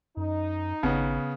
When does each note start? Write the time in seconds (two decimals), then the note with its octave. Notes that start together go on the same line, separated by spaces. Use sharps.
0.17 F#2 D#4
0.83 G#1 C#3 B3